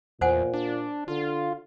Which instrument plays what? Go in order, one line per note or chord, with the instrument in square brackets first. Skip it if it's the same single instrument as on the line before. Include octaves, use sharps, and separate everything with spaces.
[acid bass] E2 [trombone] A#2 [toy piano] C5 F#5 G#5
[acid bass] D4
[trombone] D3 [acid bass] F4